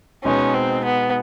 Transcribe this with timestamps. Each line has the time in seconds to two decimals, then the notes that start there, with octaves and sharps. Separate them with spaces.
0.24 B2 G#3 B3 C#4 D#4
0.54 C4
0.85 B3